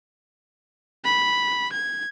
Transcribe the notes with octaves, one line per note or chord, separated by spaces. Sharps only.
B5
G#6